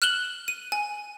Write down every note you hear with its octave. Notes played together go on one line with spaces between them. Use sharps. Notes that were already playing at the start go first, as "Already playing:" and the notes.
F6 F#6 E7 F#7 G7
D#7
G#5